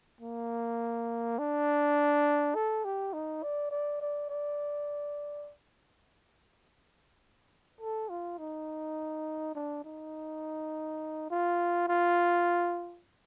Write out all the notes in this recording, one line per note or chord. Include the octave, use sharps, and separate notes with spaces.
A#3
D4
A4
G4
D#4
D5
D5
D5
D5
A4
F4
D#4
D4
D#4
F4
F4